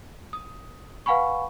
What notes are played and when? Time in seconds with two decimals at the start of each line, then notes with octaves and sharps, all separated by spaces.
0.33 D#6
1.06 B4 F5 F#5 G#5 B5 C#6